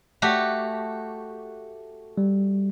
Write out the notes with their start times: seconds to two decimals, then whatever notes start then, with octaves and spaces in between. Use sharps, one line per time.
0.22 A3 F#4 G4
2.18 G3